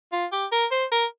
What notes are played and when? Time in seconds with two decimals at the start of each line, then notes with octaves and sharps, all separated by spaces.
0.12 F4
0.32 G4
0.52 A#4
0.71 C5
0.92 A#4